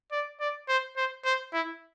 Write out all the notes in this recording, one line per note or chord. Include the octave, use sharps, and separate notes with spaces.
D5
D5
C5
C5
C5
E4